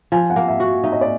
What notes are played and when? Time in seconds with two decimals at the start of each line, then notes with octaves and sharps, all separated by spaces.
0.12 F3 G#5
0.30 F#5
0.36 A#3
0.48 E5
0.60 F#4
0.84 D#4 E5
0.92 D#5
1.01 D5